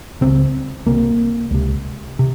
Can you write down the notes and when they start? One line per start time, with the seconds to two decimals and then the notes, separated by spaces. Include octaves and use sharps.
0.21 C#2 C#3 C4
0.86 C2 C3 A#3
1.51 C#2 C3
2.19 C3